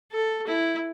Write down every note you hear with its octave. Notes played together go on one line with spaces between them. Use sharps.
A4
E4